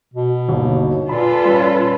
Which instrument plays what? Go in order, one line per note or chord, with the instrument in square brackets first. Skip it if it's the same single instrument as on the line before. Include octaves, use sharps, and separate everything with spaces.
[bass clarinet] B2
[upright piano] G1 D#2
[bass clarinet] A#2 [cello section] F4 A4 B4 [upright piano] B5
[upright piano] G3 C#4